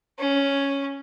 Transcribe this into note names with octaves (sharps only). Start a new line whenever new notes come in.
C#4